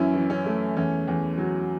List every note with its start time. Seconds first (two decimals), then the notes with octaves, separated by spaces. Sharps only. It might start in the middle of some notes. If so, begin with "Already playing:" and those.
Already playing: F#2 E3 C#4 E4
0.14 E3
0.30 C#4
0.46 A3
0.76 E2 C#4
1.08 E2
1.38 F#3